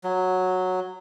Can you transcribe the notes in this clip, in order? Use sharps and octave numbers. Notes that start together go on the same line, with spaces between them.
F#3